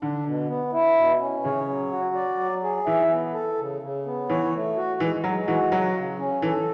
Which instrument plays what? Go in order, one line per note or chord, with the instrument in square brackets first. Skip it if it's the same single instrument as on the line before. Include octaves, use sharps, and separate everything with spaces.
[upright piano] D3 [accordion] D4
[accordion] B2
B3
E4
B2
C#4
[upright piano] C#3 [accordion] C#5
[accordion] F#3
F#4
D5
F#3
G#4
[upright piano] E3 [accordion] E5
[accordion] B3
A4
C#3
C#3
B3
[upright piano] E3 [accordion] C#5
[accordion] A3
F#4
[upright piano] E3 [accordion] G#3
[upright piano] F#3 [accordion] G#3
[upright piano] E3 [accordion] F#4
[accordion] C#3 [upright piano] F#3
[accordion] C#3
C#4
[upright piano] E3 [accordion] A4